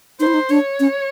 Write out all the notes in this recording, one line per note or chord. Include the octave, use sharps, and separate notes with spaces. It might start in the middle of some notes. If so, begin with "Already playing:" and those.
D#4 C5
E4
D#4
D4 C#5
C#4